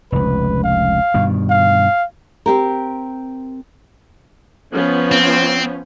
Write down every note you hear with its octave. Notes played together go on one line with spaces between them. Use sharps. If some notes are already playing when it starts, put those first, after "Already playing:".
F1 C#2 B4
F5
G2 B2 D#3
F5
C4 G4 A#4
F3 B3 C#4
C4